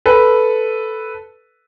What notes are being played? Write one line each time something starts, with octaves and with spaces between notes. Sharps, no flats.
A4 B4